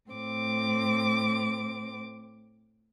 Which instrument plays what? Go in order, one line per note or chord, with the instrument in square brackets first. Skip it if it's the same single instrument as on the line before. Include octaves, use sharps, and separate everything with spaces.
[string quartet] A2 C4 D6